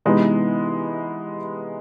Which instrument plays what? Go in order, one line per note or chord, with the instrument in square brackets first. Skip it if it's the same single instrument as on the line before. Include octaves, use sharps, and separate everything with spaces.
[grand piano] C3 E3 G#3 B3 D#4